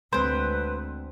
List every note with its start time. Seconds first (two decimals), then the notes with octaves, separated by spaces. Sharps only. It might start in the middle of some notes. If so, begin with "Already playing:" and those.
0.13 D2 G#3 C4 B4 C5